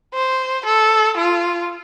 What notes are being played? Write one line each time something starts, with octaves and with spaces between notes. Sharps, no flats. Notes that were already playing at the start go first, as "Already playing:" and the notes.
C5
A4
F4